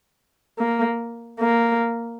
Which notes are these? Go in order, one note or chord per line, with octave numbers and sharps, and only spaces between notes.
A#3
A#3